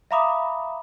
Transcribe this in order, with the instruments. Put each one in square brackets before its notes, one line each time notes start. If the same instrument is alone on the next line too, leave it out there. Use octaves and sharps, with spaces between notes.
[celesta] E5 F5 A#5 B5 D6 D#6